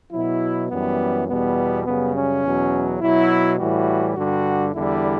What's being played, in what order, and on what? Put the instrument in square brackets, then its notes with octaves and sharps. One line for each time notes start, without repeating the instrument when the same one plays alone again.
[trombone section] B2 F#3 E4
F#2 E3 G3 B3
E2 B2 G3 B3
F#2 C#3 G3 B3
C#4
E2 B2 F#3
B2 F#3 E4
A2 E3 G3 F#4
G2 D3 G3 F#4
E2 D3 G3 E4